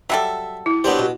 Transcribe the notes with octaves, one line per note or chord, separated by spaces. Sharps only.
F#3 G3 A4 E5
E4
F#3 B3 D4 G4 C5
B2